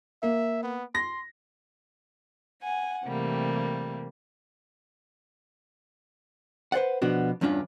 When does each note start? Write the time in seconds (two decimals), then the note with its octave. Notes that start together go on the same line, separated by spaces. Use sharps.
0.23 A#3 E5
0.63 B3
0.95 C6 A#6
2.63 F#5 G#5
3.04 C3 E3 G3 A3 A#3
6.72 B4 C5 D5 F#5
7.02 B2 F3 B3 D4 F#4
7.41 E2 G2 C#4 D4 F4